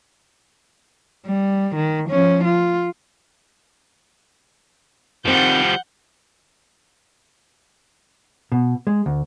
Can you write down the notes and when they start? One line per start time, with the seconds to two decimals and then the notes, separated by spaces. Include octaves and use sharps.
1.26 G3
1.75 D#3
2.09 F3 C#4
2.44 F4
5.25 D#3 F3 G3 C4 F#5 G6
8.52 B2
8.87 G#3
9.06 D2